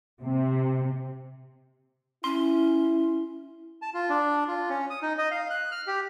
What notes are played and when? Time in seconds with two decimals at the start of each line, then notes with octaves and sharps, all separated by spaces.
0.23 C3
2.24 C#4 E4 C6
3.82 A5
3.94 F4
4.10 D4
4.48 F4
4.69 C#4
4.90 D#6
5.02 D#4
5.18 D#5
5.31 F5
5.50 F#6
5.72 F6
5.87 G4